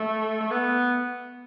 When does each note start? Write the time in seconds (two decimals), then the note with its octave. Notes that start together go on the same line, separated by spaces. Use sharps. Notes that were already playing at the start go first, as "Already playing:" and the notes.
Already playing: A3
0.40 A3
0.51 B3